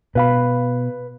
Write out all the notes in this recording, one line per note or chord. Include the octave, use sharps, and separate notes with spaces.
B2 B4 F5 B5